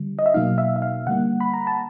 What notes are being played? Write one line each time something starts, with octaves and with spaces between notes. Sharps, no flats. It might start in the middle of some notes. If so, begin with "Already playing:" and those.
Already playing: D3 G3
D#5
E5
B2 F#3 A#3 D#4 F5
E5
E5
F5
D3 G3 A#3 F#5
B5
A#5
A5